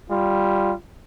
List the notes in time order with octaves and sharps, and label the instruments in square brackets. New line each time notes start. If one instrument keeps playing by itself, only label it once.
[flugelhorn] G3 [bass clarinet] F4